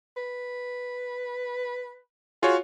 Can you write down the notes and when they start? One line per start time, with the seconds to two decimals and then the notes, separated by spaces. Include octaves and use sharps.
0.17 B4
2.43 F4 F#4 G#4 C#5